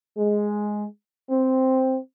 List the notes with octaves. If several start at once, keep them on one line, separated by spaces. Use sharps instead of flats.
G#3
C4